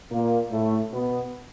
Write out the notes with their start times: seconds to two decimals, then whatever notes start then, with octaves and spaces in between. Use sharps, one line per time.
0.11 A#2 A#3
0.52 A2 A3
0.92 B2 B3